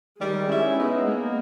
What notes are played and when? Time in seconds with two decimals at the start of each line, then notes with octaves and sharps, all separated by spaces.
0.19 D#3 G3 G#3
0.47 C#4 E4
0.76 G#3 B3 D#4
1.06 A#3 B3 D#4